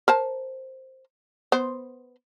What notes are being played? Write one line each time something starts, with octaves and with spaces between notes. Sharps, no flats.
A#4 C5 A5
B3 C5